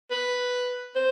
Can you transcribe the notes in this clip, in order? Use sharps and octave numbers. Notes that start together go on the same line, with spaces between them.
B4
C5